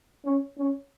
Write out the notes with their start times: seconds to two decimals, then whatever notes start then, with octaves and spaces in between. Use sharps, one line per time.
0.25 C#4
0.58 C#4